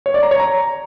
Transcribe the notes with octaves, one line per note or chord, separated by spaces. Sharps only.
C#5
D5
A#5
C#5
A#5